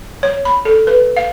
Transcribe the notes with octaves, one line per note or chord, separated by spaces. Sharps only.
C#5
B5
A4
B4
F5